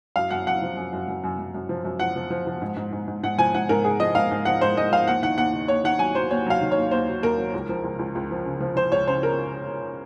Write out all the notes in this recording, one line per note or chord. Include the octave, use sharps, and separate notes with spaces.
F#2 F5
F#2 F#5
F#2 F#5
F3
F#2
F#2
F#2
F#2
F#2
F#2
F3
F#2
F3 F#5
F3
F3
F3
G#2
G#2
G#2
G#2
G#2 F#5
F3 G#5
G#2 F#5
G#2 A#4
G#2 G#4
F3 D#5
G#2 F5
G#2
F3 F#5
G#2 C5
G#2 D#5
F3 F5
D#2 F#5
D#3 F#5
D#2 F#5
D#3
D#2 C#5
D#3 F#5
F#3 G#5
F#3 C5
D#2 C#5
F#3 F5
D#3
D#2 C#5
D#2 C5
F#3
D#2 A#4
F#3
C#2
F3
C#2
C#2
C#2
F3
C#3
F3
F3 C5
C#2 C#5
C#3 C5
A#4